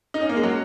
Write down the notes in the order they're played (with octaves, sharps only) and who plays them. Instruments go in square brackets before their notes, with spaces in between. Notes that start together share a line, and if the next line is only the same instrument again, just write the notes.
[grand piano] D#4
C#4
A#3
G#3
F#3